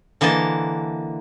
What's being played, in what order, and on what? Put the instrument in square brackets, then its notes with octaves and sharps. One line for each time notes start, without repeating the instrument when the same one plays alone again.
[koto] D3 E3 A#3 D#5 A5